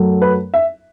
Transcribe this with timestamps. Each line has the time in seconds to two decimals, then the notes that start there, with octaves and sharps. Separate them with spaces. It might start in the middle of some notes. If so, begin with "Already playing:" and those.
Already playing: F#2 F#3 A3
0.22 B4
0.54 E5